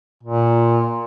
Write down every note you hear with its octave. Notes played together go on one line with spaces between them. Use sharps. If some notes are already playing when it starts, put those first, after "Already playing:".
A#2